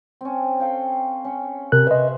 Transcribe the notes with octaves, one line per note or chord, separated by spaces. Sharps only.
C4 C#4
A4 F5 G5
C#4
C3 A#4 F#6
B4 C5 D#5 E5